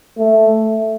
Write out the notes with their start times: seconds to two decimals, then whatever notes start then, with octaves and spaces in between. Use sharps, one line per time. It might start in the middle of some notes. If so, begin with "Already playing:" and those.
0.18 A3